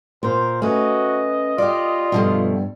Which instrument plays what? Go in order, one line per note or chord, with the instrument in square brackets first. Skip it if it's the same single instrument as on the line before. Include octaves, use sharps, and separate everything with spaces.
[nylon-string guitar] A#2 [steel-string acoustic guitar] A#4 F5 [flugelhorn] C5
[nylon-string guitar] A3 [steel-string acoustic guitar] C#4 B4 [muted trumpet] F#4 [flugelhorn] D#5
[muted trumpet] F4 [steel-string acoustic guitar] G4 D5
[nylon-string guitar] G2 G3 [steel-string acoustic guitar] B2 F3 A3